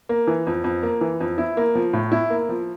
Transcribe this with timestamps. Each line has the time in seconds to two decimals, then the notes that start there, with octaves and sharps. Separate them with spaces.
0.09 A#3
0.27 E3
0.47 F2
0.64 F2
0.83 A#3
1.01 E3
1.20 F2
1.38 E4
1.57 A#3
1.75 F3
1.93 A2
2.12 E4
2.30 A#3
2.49 F3